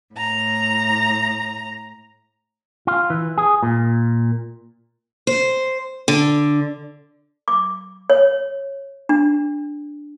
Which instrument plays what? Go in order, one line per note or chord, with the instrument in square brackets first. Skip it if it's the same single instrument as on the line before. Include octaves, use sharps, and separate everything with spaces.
[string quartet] A2 A#5
[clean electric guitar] F4
E3
G#4
A#2
[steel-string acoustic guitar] C5
D3
[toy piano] D6
C#5
D4